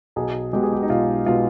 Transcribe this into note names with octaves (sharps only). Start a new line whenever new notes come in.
B1 G#4
B2 G#3 G4
G#4
G4
D#4
B1 F4
B2 G#3 F4